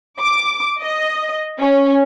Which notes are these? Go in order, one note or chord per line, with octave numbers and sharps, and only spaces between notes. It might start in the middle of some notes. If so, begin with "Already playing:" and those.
D6
D#5
C#4